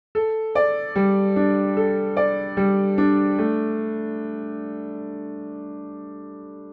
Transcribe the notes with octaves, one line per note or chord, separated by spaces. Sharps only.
A4
D5
G3
D4
A4
D5
G3
D4
A3